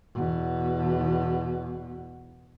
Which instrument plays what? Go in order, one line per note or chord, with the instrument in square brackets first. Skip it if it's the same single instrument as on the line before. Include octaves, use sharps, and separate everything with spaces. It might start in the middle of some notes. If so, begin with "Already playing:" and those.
[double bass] E2 B2